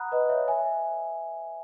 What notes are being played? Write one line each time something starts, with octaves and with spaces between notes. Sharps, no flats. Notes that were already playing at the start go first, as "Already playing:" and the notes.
Already playing: F#5 A#5 B5 D#6 F#6
B4 D#5
C#5 E5
E5 G#5